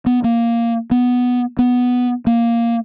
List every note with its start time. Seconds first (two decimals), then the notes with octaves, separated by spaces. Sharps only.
0.06 B3
0.24 A#3
0.91 B3
1.59 B3
2.27 A#3